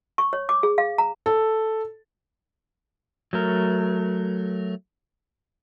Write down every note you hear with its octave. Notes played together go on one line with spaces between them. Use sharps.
C#6
C#5
D6
G#4
F5
A#5
A4
F#3 A3 A#4